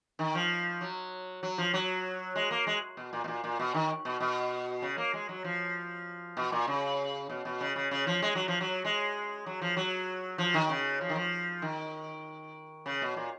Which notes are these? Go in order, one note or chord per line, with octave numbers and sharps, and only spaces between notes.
D#3
F3
F#3
F#3
F3
F#3
G#3
A#3
G#3
B2
A#2
B2
A#2
A#2
B2
D#3
B2
B2
C#3
A#3
G#3
F#3
F3
B2
A#2
C#3
B2
B2
C#3
C#3
C#3
F3
G#3
F#3
F3
F#3
G#3
F#3
F3
F#3
F3
D#3
C#3
F3
D#3
F3
D#3
C#3
B2
A#2